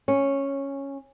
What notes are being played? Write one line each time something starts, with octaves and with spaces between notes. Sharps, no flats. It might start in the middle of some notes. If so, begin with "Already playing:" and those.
C#4